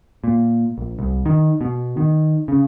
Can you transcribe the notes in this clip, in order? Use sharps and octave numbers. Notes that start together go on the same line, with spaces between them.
A#2
A#1
C2
D#3
B2
D#3
C#3